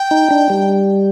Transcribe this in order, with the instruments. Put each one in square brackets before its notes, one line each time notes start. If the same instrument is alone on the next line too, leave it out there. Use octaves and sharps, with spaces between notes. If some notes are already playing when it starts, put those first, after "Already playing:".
Already playing: [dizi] G5
[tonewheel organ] D#4
D4
G3